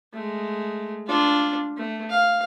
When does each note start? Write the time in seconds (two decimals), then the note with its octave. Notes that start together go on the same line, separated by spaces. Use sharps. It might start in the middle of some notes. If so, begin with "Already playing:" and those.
0.13 G#3 A3
1.07 D4 F4
1.77 A3
2.10 F5